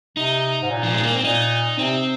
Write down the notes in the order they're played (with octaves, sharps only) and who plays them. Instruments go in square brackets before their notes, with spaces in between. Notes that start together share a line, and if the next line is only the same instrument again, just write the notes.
[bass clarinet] C3 [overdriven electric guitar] D#4
[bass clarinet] G#2
A#2
[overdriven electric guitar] F3
G#3
A#3
C4
[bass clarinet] A#2 [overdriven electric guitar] D#4
[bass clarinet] C3 [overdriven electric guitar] C4